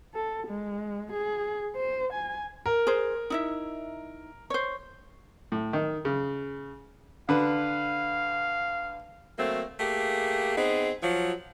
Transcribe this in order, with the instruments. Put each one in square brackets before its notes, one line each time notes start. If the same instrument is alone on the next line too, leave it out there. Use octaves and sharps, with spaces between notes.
[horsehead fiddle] A4
G#3
G#4
C5
G#5
[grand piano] A#4
[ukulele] G#4 C5
D#4 E4 E5
C5 C#5
[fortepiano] A2
D#3
C#3
[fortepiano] D3 B4 [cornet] F5
[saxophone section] F#3 A3 A#3 C4
A3 A#3 G4 G#4
B3 C4 D#4 G#4
F3 F#3